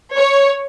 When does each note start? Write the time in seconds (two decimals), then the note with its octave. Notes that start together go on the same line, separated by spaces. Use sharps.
0.16 C#5